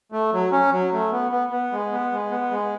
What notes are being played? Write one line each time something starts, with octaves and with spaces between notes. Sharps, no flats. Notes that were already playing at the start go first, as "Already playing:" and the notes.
A3
F#3
C#4
F#3
A3
B3
B3
B3
G#3
B3
G#3
B3
G#3